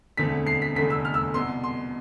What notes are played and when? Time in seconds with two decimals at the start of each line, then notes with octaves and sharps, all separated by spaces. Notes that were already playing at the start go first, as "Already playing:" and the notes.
0.17 E1 D2 D3 A3 C4 B6
0.47 C7
0.62 B6
0.75 F1 E2 D3 A3 B6
0.90 E6
1.05 F6
1.14 E6
1.34 C2 B2 B3 C6
1.64 C6